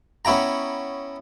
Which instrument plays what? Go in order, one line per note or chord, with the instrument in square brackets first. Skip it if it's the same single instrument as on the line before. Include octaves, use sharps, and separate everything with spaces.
[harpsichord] B3 C#4 E4 G5 A#5